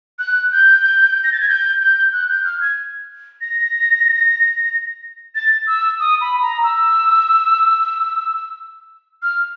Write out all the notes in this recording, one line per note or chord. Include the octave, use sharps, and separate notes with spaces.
F#6
G6
A#6
A6
G#6
G6
G6
F#6
G6
F6
G#6
A#6
A6
E6
D#6
B5
A#5
E6
F6